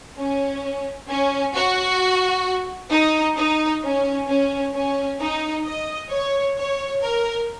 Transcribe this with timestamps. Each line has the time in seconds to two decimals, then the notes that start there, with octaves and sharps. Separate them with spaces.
0.18 C#4
1.09 C#4
1.54 F#4
2.90 D#4
3.37 D#4
3.83 C#4
4.28 C#4
4.74 C#4
5.20 D#4
5.65 D#5
6.10 C#5
6.57 C#5
7.02 A#4